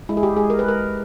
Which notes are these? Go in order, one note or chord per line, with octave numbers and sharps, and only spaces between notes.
G#3 E4
G#4
G4
G#3 G#4
A#4
B4
G#3 A#4